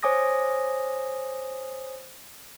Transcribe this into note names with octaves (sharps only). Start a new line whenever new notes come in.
C5 C#5 G#5 D6 D#6 A#6